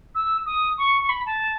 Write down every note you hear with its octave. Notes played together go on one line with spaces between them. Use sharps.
E6
D#6
C#6
C#6
B5
A5